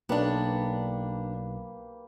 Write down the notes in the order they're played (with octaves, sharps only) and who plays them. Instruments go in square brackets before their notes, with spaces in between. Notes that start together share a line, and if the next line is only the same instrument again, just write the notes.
[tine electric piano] B1 [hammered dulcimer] A#3 G4 B4 [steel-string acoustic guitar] B3 D4